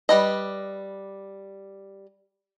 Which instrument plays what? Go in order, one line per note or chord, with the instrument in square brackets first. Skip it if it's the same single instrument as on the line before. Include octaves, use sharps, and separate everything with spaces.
[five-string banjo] G3 B4 D#5